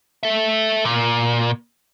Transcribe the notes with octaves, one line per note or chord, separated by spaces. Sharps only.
A4 E5
A#2